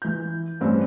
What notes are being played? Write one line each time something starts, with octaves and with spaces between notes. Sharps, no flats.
E3 G6
A1 G2 C4 C#4